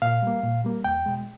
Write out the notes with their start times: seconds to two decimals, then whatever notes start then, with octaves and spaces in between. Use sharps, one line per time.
0.02 A#2 F5
0.22 G3 A#3
0.43 A#2
0.65 G3 A#3
0.84 E2 G5
1.06 B2 G#3